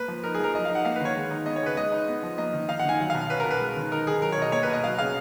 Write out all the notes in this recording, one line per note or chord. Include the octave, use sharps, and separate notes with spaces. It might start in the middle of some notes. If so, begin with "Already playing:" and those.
Already playing: A#3 B4
F3
D#4 A#4
G#4
F3 A#4
F#3 D#5
F5
D#4
F#5
A#3 F5
B4
D#3 C#5
G#3
D#4
B3 D#5
C#5
C#3 B4
G#3 D#5
D#4
B3
F3
A#3 D#5
D#3
D#4 F5
F#5
D#3 G#5
F#3 F#5
F5
B2
C#4 B4
A#4
B2
B4
G#3
D#3
D#4 A#4
D#3 G#4
F#3 A#4
C#5
B2 D#5
A#3 C#5
B4
B2
D#5
F#3 F5
C#3 F5